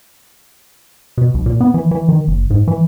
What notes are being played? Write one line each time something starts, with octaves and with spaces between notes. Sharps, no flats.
B2
B1
A#2
B3
E3
E3
D#3
F#1
G#2
E3